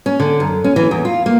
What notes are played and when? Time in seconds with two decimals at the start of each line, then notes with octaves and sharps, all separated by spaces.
0.06 C#4
0.20 D3
0.40 F#2
0.64 C#4
0.76 E3
0.91 E2
1.05 F4
1.26 A#3